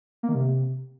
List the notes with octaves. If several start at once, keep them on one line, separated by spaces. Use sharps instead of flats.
A#3
D#3
C3